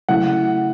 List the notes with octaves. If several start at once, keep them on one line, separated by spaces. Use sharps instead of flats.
C#3 F#3 A3 E4 F#5